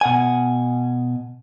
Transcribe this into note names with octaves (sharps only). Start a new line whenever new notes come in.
B2 F#5 G#5